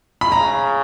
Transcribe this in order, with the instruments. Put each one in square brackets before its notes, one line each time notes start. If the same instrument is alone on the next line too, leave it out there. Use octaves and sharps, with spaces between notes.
[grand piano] B5
[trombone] C#3 [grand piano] A#5